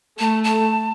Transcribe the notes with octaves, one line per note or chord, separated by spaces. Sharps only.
A3 A5
A5